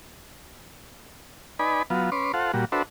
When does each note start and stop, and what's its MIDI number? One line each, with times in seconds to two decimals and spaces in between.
1.59 1.83 63
1.59 1.83 71
1.59 1.83 74
1.59 1.83 80
1.59 1.83 83
1.90 2.10 54
1.90 2.10 59
1.90 2.10 65
2.12 2.32 61
2.12 2.32 71
2.12 2.32 84
2.12 2.32 86
2.34 2.52 65
2.34 2.52 69
2.34 2.52 72
2.34 2.52 78
2.54 2.65 46
2.54 2.65 55
2.54 2.65 66
2.72 2.82 62
2.72 2.82 66
2.72 2.82 69
2.72 2.82 71
2.72 2.82 72
2.72 2.82 76